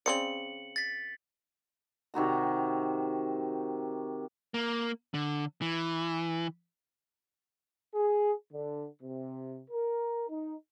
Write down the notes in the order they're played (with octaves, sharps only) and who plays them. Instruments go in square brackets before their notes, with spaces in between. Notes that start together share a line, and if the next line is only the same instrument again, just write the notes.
[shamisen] C#3 C4 D5 [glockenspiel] C#7 F#7
[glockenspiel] A6 B6
[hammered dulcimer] C3 D#3 F#4 A#5
[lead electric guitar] A#3
D3
E3
[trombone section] G#4
D3
C3
A#4
D#4